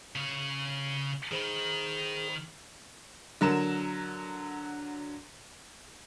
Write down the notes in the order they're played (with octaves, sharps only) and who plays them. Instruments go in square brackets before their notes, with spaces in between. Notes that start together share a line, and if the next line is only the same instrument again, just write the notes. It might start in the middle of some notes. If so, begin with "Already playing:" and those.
[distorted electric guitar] C#3 C#5
[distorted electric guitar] D#3 [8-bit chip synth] G#4 C5 B5
[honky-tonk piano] D3 F#3 A#4 E7